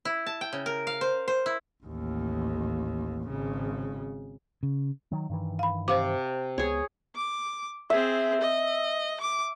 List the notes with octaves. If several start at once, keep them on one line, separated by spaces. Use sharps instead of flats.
E4
A5
G5
C#3
A#4
F5
C5
C5
E4
A1 D#2
G#1 C#3
C#3
D#3 F#3
G2 D#3 E3
F5 B5
C3 C5 F5 D6
C#2 B3 G#4 C#5
D6
C4 G#4 E5
D#5
D6